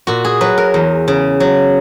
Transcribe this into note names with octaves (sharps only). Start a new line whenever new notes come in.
A#2 F#4
G#4
F#3 B4
A#4
E2
C#3
F#3